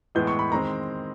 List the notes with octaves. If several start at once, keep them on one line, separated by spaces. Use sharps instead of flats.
A2 E3 G#3 B3 E4 G6
C#6
B5
D#3 G#3 C4 A#5